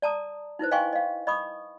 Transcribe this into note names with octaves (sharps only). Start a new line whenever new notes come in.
D5 A5 A#5 D#6
D#4 E4 B4 C5
D#5 F5 G5 G#5 C6 C#6
D#5 F5
D#5 B5 C#6 D#6